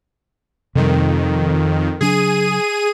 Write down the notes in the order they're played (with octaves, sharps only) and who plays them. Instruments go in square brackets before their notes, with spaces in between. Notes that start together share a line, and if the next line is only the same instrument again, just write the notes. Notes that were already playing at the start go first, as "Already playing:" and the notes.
[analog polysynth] F2 D#3 [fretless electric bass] C3 G3
[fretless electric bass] C#3 F#3 D4 [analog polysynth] G#4 D#7